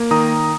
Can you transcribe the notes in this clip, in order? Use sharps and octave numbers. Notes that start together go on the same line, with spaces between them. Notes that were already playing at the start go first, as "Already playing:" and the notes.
Already playing: A#3
D#3 A#5 D#6